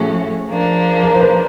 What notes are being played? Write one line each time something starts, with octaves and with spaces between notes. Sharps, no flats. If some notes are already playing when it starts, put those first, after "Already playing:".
Already playing: A2 F3 A3 C#4 F#4 G#4
F3 A#3 D4
A#4
C5
B4